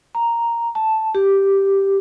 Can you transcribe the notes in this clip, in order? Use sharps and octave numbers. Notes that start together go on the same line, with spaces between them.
A#5
A5
G4